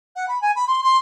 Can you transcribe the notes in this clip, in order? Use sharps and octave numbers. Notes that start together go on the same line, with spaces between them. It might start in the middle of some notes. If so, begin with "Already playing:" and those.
F#5
B5
G#5
B5
C6
C6